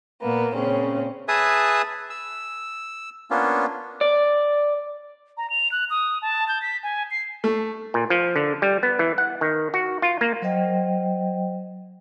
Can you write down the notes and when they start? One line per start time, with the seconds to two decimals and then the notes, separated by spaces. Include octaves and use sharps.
0.21 A#2 A#3 B3
0.54 A#2 C#3 C4 C#4
1.28 G#4 B4 E5 G#5 A5 D#6
2.10 E6
3.31 A#3 B3 C#4 D4 F4
4.01 D5
5.37 A#5
5.50 F7
5.72 F#6
5.90 D#6
6.22 A5
6.48 G6
6.62 B6
6.83 G#5
7.11 C7
7.44 A3
7.94 A#2
8.10 F3
8.36 D3
8.62 G3
8.83 B3
8.99 E3
9.18 F#5
9.41 D#3
9.74 F#4
10.02 F4
10.21 A#3
10.42 F#3 C5 D#5 G5